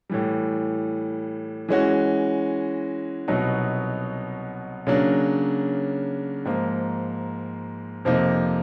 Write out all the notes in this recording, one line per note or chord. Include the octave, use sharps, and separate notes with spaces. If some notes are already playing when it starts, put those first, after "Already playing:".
A2 E3 G3
E3 G#3 C#4 F#4
C2 B2 F#3 B3 D#4
C#3 F#3 A#3 D4
G#2 F3 A#3
F2 C3 F3 A#3 D#4